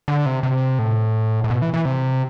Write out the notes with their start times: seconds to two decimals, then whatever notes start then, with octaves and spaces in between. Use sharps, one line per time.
0.08 D3
0.26 C3
0.43 C3
0.79 A2
1.44 A2
1.50 B2
1.62 E3
1.74 E3
1.85 C3